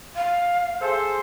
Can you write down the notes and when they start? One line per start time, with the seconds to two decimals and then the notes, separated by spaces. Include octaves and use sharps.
0.15 F5
0.81 G#4 A4 C5